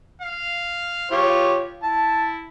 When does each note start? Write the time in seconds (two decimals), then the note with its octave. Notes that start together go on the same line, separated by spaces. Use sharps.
0.21 F5
1.11 F4 G4 C#5
1.83 E4 A5